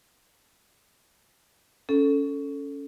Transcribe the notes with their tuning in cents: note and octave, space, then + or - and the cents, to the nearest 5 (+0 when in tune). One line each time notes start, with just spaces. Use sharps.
C#4 +10 A4 +0